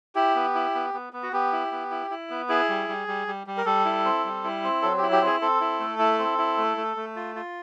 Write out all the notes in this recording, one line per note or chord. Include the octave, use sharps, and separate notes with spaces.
E4 G4
B3
E4
B3
B3
B3
F#4
B3 G4
E4
B3
E4
E4
B3
E4 G#4
G3
G3
G3
G3
G3
A#4
G3 A4
E4
C4
G3
E4
C4
F#3 A4
G4
E4
G4
C4 G#4
C4 A4
E4
A3
E4
C4
E4
A3
A3
A3
F4
F4